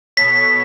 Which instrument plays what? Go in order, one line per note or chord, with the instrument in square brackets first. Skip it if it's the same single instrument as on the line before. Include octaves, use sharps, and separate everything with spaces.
[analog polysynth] B2 B3 A4 C#5 [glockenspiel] B6